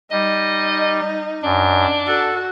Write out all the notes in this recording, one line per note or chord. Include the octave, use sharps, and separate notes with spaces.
G3 D#4 D#5
F#2 D4
F#4 A4